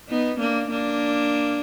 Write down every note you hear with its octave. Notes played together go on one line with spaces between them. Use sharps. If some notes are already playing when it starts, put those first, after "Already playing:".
B3 D#4
A#3 D4
A#3 D4